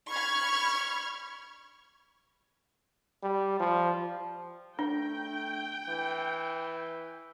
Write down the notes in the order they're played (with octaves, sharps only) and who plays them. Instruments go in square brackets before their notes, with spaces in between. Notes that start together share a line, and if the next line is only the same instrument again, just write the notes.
[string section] B5 C#6 F6 G#6
[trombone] G3
F3
[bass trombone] A3 [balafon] D4 [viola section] G5
[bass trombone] E3